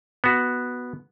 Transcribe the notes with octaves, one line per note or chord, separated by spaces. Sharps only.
B3 F#4